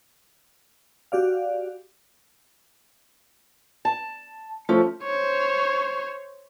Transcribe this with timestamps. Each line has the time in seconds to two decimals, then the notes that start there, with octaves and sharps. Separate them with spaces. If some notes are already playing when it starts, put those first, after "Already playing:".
1.12 F#4 G4 D5 F5
3.85 A5
4.69 F3 A3 C#4
5.03 C5 C#5